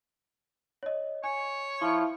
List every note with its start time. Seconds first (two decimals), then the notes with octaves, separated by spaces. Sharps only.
0.83 C#5 D#5
1.24 C#5 G#5
1.82 F3 E4 C#6